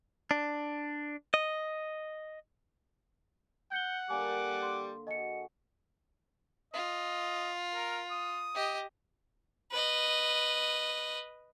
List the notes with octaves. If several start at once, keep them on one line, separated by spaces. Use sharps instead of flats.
D4
D#5
F#5 G6 C#7 G7
D3 G3 A#3 G#5 D6
C6
F#4 G#4 A4 D#5 C#7
F4 D#5
A#4
D#6
G4 D#5
B4 D#5